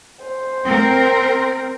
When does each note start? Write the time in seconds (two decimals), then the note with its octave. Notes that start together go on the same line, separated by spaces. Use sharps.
0.24 C5
0.65 C4 A#4